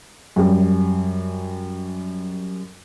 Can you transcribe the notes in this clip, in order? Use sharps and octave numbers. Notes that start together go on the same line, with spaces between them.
F#2 G3